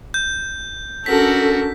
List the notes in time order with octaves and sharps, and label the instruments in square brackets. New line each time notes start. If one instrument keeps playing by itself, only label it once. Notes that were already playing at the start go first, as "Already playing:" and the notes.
[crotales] G6
[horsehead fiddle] C#4 D4 [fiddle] F#4 A#4 [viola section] A4 [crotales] B6